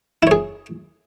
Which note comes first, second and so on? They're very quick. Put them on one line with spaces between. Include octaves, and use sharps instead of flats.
E4 C#5 G#4